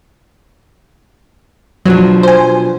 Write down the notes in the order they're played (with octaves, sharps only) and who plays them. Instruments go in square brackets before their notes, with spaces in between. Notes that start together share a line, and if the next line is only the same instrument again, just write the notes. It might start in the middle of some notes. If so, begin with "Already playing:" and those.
[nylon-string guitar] B2 F3 D4 [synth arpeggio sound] F#3
[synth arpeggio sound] C5 G#5